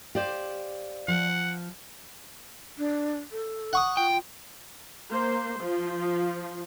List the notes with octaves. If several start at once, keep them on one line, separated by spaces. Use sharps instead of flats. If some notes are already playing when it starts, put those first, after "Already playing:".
G4 C5 D5 F5
F3 F#5
D4
A4
F#5 C#6 D#6
F4 G5
A#3 C5
F3